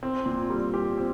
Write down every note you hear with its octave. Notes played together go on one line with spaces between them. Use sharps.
C4
A#2
G3
G4
C4